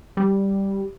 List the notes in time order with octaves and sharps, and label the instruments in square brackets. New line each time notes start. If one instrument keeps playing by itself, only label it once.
[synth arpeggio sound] G3